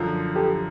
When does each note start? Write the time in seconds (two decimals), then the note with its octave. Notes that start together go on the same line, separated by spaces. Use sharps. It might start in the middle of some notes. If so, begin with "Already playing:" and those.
Already playing: F#2 D3 F3
0.36 G4 A4